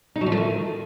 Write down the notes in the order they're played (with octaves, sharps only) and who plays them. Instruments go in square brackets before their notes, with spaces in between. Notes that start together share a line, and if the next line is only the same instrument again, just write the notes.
[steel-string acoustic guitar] D#4
F#3
F3
A3
D#3